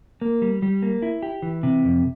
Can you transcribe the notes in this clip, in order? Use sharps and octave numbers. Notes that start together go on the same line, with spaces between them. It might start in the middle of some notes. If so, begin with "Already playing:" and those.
A#3
G3
G3
A#3
E4
G4
E3
C3
F2